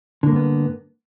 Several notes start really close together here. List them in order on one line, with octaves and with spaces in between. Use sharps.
D3 A#3 G2 B3